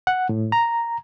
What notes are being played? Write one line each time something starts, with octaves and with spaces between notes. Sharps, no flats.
F#5
A2
A#5